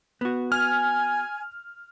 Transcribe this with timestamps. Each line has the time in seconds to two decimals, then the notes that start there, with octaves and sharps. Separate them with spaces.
0.21 B3 F#4
0.52 G#5 F6